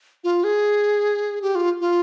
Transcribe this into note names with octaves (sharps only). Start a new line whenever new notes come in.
F4
G#4
G4
F4
F4